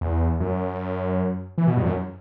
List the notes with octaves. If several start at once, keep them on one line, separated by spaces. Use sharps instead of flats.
E2
F#2
E3
B2
G2
E2
F#2